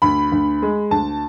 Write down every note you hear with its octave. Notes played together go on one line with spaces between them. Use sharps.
D2 B5
D2
G#3
D2 A5